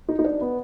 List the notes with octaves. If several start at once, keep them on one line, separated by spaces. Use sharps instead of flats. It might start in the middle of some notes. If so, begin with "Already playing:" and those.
D#4
D#4
D4
B3